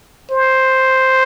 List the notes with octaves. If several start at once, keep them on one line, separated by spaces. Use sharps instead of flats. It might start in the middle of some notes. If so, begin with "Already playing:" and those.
C5